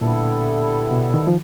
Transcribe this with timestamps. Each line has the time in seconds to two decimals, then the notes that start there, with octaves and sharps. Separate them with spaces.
0.01 A#2 D3 G3 B3 E4 A4
0.91 B2
1.14 D#3
1.27 F3